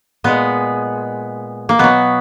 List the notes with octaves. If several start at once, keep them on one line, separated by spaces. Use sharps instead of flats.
A#2 G#3 B3
A#3
B2 F#3 B3